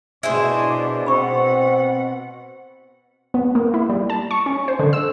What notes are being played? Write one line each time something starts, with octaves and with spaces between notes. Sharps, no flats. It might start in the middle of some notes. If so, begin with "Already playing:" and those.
B2 D4 E4 G#4 C5
B2 C4 F#5 B5 C#6 E6
B3
A#3
E4
G3
A5
C#6
C#4
C5
D3
E6